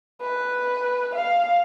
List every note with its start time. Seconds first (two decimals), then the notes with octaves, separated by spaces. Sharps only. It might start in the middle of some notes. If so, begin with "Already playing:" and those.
0.21 B4
1.15 F5